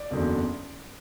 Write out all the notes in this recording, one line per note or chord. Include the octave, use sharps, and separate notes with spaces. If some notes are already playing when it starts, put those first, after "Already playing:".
Already playing: D5
F#1 E2 D3 F#3